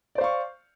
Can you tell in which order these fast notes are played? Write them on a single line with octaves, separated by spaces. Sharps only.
D5 C5 F5 C#6